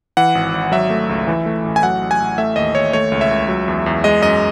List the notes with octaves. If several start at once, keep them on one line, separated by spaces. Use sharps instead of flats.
E3 F#5
G#1
G#1
F#3 E5
A3
C#2
E3
A3
A1
G#5
F#3 F#5
A1
G#5
A1
A3 E5
D#2 D#5
D#2 C#5
A3 C#5
C#2
E5
C#2
F#3
E2
E2
G#3 D#5
F#2 D#5